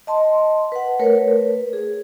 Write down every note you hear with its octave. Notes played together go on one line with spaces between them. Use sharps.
D#5 A5 C6
B4 F#5
A3 A#4 B4 C#5
G#4